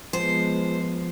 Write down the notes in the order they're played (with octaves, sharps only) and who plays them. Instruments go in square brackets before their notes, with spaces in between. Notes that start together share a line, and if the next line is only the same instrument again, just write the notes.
[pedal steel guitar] F3 [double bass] G#3 B3 [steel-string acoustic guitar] C5